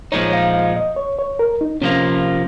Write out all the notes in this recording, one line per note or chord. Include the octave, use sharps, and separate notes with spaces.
A#2 F3 G#3 D#4 C#5
F5
F5
D#5
C#5
C#5
A#4
D#4
C3 F3 A#3 C#4 F4